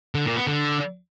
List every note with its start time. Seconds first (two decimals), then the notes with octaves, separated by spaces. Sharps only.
0.15 D3
0.26 A#2
0.36 B3
0.47 D3